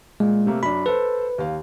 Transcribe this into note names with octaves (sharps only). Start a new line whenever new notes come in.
A#2 G#3
C3 A3 A#3
F#2 D4 B5
A4 B4 C5
D#2 F5